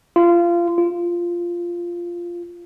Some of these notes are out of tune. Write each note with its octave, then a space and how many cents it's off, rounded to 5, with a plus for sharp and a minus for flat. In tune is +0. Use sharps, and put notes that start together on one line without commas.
F4 -25
F4 -10